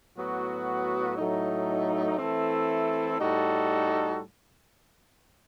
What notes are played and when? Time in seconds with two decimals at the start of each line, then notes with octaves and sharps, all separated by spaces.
0.15 A2 F#3 B3 F#4
1.17 A2 F#3 A3 D#4
2.18 E3 A3 C4 E4 A4
3.19 A2 G3 D#4 F#4 A4